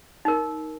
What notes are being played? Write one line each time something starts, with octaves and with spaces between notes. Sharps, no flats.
D#4 A#4